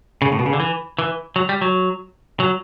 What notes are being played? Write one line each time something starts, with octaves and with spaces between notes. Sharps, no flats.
C#3
A2
B2
C#3
D3
E3
E3
F#3
G3
F#3
F#3